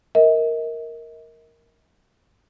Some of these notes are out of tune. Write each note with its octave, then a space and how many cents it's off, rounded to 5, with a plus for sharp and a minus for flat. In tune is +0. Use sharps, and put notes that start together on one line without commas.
A#4 +0 D#5 +40